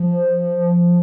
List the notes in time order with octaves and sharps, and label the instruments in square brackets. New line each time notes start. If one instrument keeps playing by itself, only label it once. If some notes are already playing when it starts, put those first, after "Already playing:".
Already playing: [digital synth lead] F3